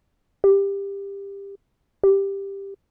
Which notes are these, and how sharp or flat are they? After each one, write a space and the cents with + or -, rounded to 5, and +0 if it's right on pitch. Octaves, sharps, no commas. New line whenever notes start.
G4 +20
G4 +10